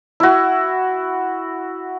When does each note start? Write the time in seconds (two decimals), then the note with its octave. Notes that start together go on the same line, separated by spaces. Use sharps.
0.20 E4 F#4